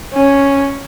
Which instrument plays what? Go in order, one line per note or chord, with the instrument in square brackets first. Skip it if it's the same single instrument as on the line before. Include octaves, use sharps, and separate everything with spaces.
[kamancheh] C#4